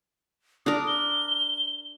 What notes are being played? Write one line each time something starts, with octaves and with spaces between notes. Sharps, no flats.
D4 A#4 D#6
G7